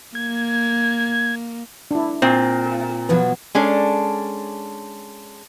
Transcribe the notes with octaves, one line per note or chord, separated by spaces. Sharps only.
A#3 G#6
D4 E4
A#2 C4
B2 F3 F#3 B4
G#3 C#4 D4 A4